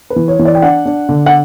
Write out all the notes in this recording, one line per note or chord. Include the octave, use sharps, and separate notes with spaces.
B4
E3
C#5
E3
D5
G5
D4 F#5
D4
D3
F#5